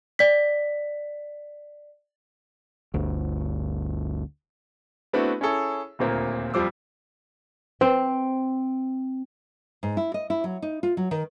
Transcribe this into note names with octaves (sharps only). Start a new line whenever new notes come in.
D5 B6
G1 D2
A3 B3 C4 D4 E4 F#4
C#4 E4 G#4 A4 C#5
D#1 D2 A#2 A#3 C4
F2 F3 G3 C5 D6 E6
C4
G#2
E4
D#5
E4
F#3
D#4
F4
F#3
D#3